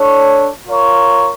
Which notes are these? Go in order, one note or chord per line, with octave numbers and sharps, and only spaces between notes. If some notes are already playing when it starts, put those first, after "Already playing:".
Already playing: D4 A4 C#5
F4 A#4 C#5